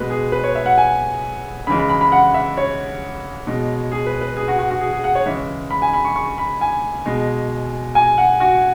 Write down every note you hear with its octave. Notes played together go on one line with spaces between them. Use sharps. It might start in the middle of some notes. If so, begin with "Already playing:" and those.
Already playing: B2 G#3 B4
G#4
B4
C#5
E5
F#5
G#5
C#3 E3 G#3 B5
B5
B5
B5
F#5
E5
C#5
B2 G#3
G#4
B4
B4
G#4
F#4
F#4
F#4
G#4
G#4
F#5
C#5
C#3 E3 G#3 E5
B5
G#5
B5
C#6
C#6
B5
G#5
B2 G#3
G#5
F#5
F#4